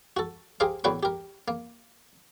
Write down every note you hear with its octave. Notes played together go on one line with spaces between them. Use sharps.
F#4 A4
G4 G#4 A#4 C5 F5 G5
E2 A2 F#4 B4 G5 C#6
G4 A#4
A#3